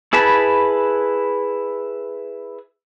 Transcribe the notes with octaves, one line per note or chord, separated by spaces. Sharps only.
E4 G#4 B4 A5 B5